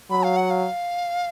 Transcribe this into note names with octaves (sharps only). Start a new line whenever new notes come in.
F#3 B5
F5
F#5
F5